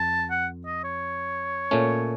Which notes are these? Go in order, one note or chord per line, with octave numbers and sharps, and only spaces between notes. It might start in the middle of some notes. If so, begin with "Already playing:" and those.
Already playing: F2 A5
F#5
D#5
C#5
A#2 A3 C#4